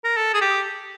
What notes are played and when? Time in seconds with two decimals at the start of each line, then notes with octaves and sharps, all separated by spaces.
0.04 A#4
0.17 A4
0.34 G#4
0.41 G4